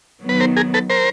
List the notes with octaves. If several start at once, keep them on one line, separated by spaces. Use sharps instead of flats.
D#3 F#3 B3 B4
A#4 C5
G#4 A#4
A4 B4
A#4 C5